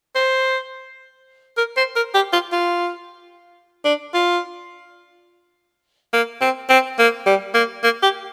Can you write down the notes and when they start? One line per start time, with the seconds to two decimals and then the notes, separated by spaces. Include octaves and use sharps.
0.15 C5
1.57 A#4
1.77 C5
1.96 A#4
2.15 G4
2.33 F4
2.52 F4
3.85 D4
4.14 F4
6.13 A#3
6.41 C4
6.70 C4
6.99 A#3
7.26 G3
7.54 A#3
7.84 A#3
8.03 G4